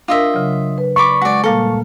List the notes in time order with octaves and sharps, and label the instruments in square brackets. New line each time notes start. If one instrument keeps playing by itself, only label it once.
[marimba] D4 A#4 [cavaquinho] F4 D#5 E5
[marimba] C#3 F#3
B4
[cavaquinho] D5 B5 D6 [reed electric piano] C#6
[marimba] G#3 [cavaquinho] F#4 D5
[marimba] A#2 G3 A#3 [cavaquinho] A4 F5